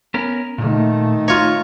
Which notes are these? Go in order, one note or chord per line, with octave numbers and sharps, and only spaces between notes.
B3 C#4 A#4
A#2 D#3 A3
D#4 F4 C#5